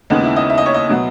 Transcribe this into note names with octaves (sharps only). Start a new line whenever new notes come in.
D#2 C#3 G#3 B3 D#4
E4
D#5
E5
D#5
C#5
D#5
B2 F#3 B3